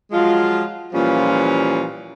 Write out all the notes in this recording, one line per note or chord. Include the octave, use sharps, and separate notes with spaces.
F3 F#3 G#3 F4
A#2 E3 F3 G3 C#4 F4